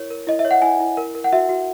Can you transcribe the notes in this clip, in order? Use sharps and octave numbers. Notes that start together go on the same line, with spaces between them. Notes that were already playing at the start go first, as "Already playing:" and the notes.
Already playing: E4 A#4 C#5
A#4
E4 D#5
E5
C#5
F#5
E4 G#5
E4
A#4
A#4
F#5
F#4 E5
F#4